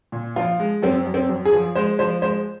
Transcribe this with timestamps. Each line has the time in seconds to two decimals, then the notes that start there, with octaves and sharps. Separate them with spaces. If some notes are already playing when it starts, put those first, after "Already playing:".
0.12 A#2
0.36 F3 F4
0.60 G#3
0.83 F#2 C4
1.06 F#2
1.14 C4
1.29 F#2
1.45 G#4
1.53 F3
1.75 G#3 C5
1.99 F3 C5
2.22 G#3 C5